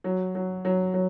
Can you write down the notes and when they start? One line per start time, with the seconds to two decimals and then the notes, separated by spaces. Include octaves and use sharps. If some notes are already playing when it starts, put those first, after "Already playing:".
0.04 F#3
0.35 F#3
0.65 F#3
0.94 F#3